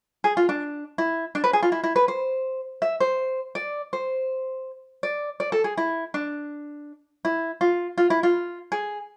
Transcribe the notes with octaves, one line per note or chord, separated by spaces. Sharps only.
G#4
F4
D4
E4
D4
B4
G#4
F4
E4
E4
B4
C5
E5
C5
D5
C5
D5
D5
A4
G#4
E4
D4
E4
F4
F4
E4
F4
G#4